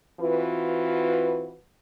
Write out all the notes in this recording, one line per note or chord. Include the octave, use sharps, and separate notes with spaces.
E3 C4 F4 F#4 B4